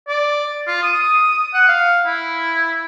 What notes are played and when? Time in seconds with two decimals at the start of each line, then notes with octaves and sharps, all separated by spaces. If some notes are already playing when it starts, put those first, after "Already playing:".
0.08 D5
0.67 F4
0.83 D#6
1.54 F#5
1.68 F5
2.06 E4